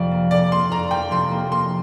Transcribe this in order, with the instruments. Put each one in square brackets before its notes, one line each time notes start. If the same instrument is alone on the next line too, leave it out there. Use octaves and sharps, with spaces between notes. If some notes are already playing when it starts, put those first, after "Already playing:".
Already playing: [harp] F1 F2 F3 [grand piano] D5
[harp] A#3
[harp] F1 [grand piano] D5
[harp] A#3 [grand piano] C6
[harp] F2 [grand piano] A#5
[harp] A#3 [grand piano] G5
[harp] F1 [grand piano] C6
[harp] A#3
[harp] A#3 [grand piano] C6